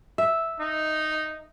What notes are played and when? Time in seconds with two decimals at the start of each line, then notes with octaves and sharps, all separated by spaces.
0.18 E5
0.60 D#4